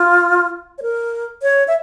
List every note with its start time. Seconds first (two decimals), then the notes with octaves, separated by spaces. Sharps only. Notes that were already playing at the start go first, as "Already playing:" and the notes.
Already playing: F4
0.78 C#5
0.82 A#4
1.43 C#5
1.68 E5